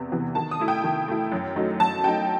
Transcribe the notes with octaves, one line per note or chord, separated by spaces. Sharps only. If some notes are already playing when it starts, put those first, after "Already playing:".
Already playing: E2 C3 E3 B3
C3 E3 B3
D#3 A5
D#6
A3 E4
G5
D#3
A3 E4
F#2
F#3 A3 D#4
F#2 A5
F#3 A3 D#4 G5